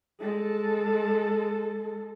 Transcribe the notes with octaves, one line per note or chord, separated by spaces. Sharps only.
G#3 A4